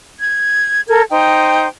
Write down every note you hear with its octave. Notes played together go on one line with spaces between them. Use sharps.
G#6
A4 A#4 G#6
D#4 C5 G5